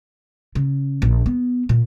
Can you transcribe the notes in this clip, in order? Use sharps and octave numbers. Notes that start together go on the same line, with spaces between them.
C#3
A#1
B3
A#2